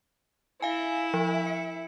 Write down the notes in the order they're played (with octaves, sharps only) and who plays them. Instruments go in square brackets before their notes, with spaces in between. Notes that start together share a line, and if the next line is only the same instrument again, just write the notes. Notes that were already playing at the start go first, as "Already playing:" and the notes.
[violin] E4 E5 [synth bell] F5 G#5
[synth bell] F3
C#7